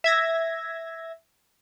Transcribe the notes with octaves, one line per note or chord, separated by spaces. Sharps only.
E5 G#6 A#6